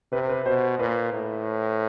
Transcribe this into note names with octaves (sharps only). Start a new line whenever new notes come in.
C3 B4
B4
B2 C5
A#2 B4
A2